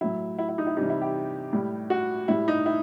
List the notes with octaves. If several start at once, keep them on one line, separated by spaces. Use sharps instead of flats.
A2 F#3 E4
E4
E4
D#4
E4
C3 E3 G3 D#4
E4
G4
A2 G3
F#4
A2 G3 E4
D#4
E4